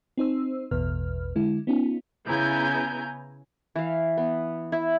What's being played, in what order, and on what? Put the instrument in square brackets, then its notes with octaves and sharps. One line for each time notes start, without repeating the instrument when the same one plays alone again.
[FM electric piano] C4 D#4 C5 E6
A1 E2 B2 B4 F6
D3 G#3 E4
B3 C#4 D#4 F4
[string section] C#3 B3 E4 G#5 A#5 G6
[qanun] E3 F5
B3
E4